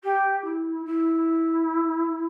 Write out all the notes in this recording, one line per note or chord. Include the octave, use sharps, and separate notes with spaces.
G4
E4
E4